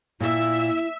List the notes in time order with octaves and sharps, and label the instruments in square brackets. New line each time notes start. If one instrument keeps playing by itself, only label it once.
[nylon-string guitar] A#2 [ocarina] E4 [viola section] E5